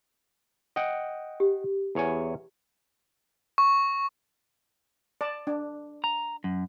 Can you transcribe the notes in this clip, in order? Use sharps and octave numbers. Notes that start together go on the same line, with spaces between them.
D#5 F#5 G5
G4
E2 C#5 G#5
C#6
D5 A5
D4
A#5
F#2